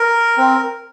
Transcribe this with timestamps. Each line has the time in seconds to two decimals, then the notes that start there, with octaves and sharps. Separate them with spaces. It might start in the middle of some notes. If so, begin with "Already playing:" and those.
Already playing: A#4
0.38 C4